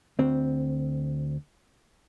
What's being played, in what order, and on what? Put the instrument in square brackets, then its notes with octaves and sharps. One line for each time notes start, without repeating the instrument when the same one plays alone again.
[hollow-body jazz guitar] D2 C4